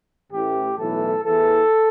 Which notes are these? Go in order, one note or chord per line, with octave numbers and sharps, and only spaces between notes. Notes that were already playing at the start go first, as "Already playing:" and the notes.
A1 A2 E3 G4
B1 A2 E3 A4
E2 E3 A4